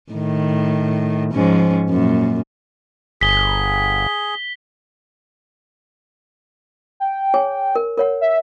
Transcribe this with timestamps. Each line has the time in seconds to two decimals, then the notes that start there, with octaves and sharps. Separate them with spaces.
0.12 A2 D#3
1.32 G#2 F3 C#4
1.89 F#2 A#2
3.21 G1 G#4 B6 G7
7.00 G5
7.34 G#4 C#5 G#5
7.75 A#4
7.98 A#4 C#5 F#5
8.21 E5